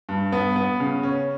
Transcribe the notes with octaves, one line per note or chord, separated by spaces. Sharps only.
G2
B3
B3
C#3
C#4